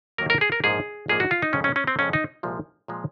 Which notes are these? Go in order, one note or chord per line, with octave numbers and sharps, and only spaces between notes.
D#2 D#3 F#3 A#3 A#4
A#4
G#4
A#4
A#1 G#2 F3 A#3 G#4
A#1 G#2 F3 A#3 G#4
F#4
F4
D#4
F2 C#3 G#3 C#4
C#4
C#4
C4
F2 C#3 G#3 C#4
D#4
C2 A#2 F3 G#3
A#2 F3 G#3